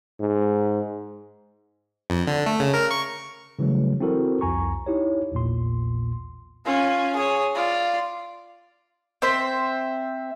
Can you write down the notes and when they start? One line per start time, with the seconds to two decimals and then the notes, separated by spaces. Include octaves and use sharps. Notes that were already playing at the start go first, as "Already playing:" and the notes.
0.20 G#2
2.10 F2
2.27 D3
2.46 A3
2.60 C#3
2.74 A#4
2.91 C#6
3.59 C#3 E3 F#3 G3 A3
4.00 C4 E4 F#4 A4 A#4 C5
4.41 C2 F2 G#5 A#5 C#6
4.86 D#4 E4 G4 C#5
5.32 A#1 E2 A#2 C6
6.66 C#4 F4
7.16 G#4 C#5
7.55 F4 D5
9.22 C4 C5 E5